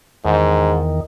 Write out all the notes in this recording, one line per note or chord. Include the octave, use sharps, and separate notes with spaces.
E2 G#2 D#3